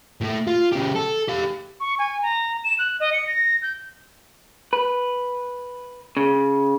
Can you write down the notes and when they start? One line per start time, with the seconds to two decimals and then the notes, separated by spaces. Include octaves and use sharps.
0.21 A2 A3
0.47 F4
0.72 C#3 G4
0.96 A4
1.29 G4 F5
1.80 C#6
1.99 G#5
2.22 A#5
2.64 E7
2.79 F#6
3.00 D#5
3.13 C#7
3.27 A#6
3.62 G6
4.73 B4
6.17 C#3